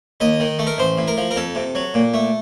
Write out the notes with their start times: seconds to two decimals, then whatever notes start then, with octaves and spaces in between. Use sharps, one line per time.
0.20 D#2 D#5
0.40 D#3
0.59 A3
0.67 A#4
0.78 A1 C5
0.98 A2
1.07 A#4
1.17 F3
1.31 A#4
1.36 F2 A4
1.55 C3
1.75 F#3
1.94 A#2
2.14 A3